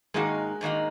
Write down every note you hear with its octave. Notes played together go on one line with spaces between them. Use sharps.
G#2 D#3 G#3 A#3 D#4 F#4
G#2 D#3 A#3 D#4 F#4